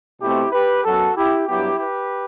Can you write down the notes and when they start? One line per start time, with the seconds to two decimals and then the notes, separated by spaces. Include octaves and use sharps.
0.21 B2 A3 C4 E4 G4
0.52 G4 B4
0.84 F#2 F#3 B3 F#4 A4
1.16 E4 G4
1.48 G2 F#3 B3 E4 G4
1.80 G4 B4